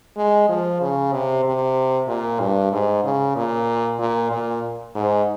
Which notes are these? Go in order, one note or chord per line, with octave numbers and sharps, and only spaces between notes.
G#3
F3
C#3
C3
C3
A#2
G2
G#2
C#3
A#2
A#2
A#2
G#2